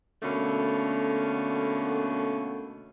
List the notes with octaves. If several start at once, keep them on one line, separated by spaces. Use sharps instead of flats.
B2 D3 A3 A#3 C#4